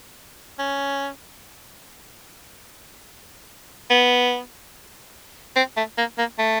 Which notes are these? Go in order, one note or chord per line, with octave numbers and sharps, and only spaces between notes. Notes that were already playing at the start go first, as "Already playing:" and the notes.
C#4
B3
C4
A3
A#3
A#3
A3